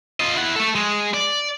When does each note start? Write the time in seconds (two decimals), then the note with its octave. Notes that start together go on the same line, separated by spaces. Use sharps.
0.20 F4 D#5
0.37 E4 F#5
0.56 A3 A4
0.75 G#3
1.14 D5